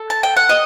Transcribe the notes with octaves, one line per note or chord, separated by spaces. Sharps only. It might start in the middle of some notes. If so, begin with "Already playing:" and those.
Already playing: A4
A5
G5
F#5
D#5